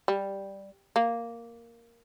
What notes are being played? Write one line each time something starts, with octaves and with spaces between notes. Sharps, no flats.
G3
A#3